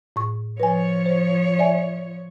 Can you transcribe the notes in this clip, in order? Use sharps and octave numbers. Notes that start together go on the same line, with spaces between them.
A2 C#6
F3 B4 C#5 G#5
C5
D5 E5 G#5